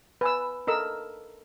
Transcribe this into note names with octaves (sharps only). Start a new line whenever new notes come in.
B4 G#5 E6
A4 A#4 D#5 E6